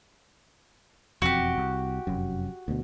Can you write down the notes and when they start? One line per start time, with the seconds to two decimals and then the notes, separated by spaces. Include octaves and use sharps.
1.22 E1 F2 C4 F#4 G4
1.58 C2
2.07 F1 F#2
2.68 D2 B2